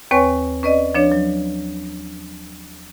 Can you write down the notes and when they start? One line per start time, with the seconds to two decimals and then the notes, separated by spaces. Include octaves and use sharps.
0.11 D#2 C4 B4 C#5 G#5 C#6
0.63 C#4 B4 D5 D#5
0.95 F3 D4 C#5
1.12 F#3